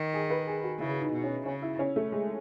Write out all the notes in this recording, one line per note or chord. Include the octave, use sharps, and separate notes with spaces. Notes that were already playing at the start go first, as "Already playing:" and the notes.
Already playing: D#3
G#4
B4
G#4
F#4
C#3 E4
D#4
B2
C#4
C#3 C#4
E4
C#4
A3
G#3